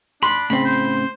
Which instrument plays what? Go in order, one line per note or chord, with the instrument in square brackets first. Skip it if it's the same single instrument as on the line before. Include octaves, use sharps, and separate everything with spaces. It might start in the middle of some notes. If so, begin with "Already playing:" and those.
[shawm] D4 [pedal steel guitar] B5 [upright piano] C6
[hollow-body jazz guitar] A2 C#3 C4 [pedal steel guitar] B5
[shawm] C5